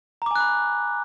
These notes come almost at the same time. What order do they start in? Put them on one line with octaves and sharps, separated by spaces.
A#5 D6 G#5 F#6 B5